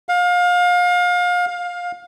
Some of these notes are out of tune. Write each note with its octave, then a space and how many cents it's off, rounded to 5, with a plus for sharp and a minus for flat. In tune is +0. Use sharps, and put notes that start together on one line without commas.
F5 +30
F5 +20